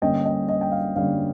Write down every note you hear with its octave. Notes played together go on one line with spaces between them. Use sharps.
G1 G2 G3 A#3 C#4 D#5 G5
D#5 G5
D#5
G5
F5
G1 G2 G3 A#3 C#4 F5